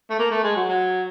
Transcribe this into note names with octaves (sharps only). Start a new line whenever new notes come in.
A3
A#3
A3
G#3
F#3
F#3